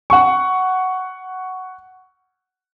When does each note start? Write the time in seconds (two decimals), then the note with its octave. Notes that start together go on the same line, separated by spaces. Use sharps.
0.10 F#5 C#6